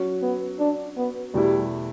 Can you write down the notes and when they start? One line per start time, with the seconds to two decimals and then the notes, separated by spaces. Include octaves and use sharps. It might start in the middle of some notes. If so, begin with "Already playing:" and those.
Already playing: F#3 C#4 F#4 C#5
0.22 B3
0.59 D4
0.97 B3
1.34 E2 B2 G3 A3 E4 G4